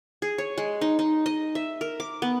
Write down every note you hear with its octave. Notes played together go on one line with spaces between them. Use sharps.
G#4
C#5
G#3
D#4
D#4
D#5
E5
A#4
D6
B3